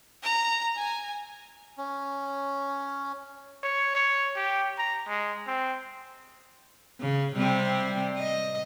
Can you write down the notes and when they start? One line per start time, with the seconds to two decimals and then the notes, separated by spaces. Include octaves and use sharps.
0.23 A#5
0.76 G#5
1.78 C#4
3.64 C#5
3.95 C#5
4.37 G4
4.78 A#5
5.08 G#3
5.47 C4
7.01 C#3
7.36 C3 G3 C4
8.17 D#5